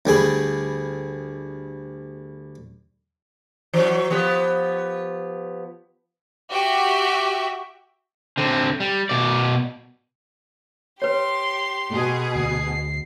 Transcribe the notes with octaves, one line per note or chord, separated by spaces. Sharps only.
D2 G3 G#4 B5
E3 F#3
F3 B3 G4
F#4 G4 E5 G5
D3 C4
G3
B2 D5
G4 B4 C#5 C6
B2 G#4
D2 C7